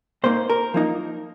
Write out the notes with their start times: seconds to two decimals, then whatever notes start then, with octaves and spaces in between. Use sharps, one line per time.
0.24 A#2 A#3 D#4 C5
0.50 A#4
0.74 F3 A#3 D#4